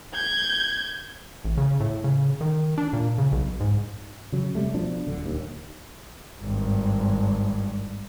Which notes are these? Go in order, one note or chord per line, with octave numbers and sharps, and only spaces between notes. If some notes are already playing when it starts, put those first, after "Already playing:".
G6 G#6
A1
C#3
A2
C#3
D#3
D4
A#2
C#3
B1
G#2
C#3 F#3
C3 G3 A3
B2 F3 D4
D1 D3
D#1 D#2
G#1 G2